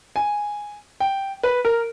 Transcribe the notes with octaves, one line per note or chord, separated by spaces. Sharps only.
G#5
G5
B4
A#4